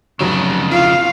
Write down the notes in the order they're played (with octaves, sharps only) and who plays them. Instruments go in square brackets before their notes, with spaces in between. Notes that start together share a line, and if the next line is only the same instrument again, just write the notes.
[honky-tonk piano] F1 F#3 E7 [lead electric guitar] F2 C#3
[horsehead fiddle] E4 F5 [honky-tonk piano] F4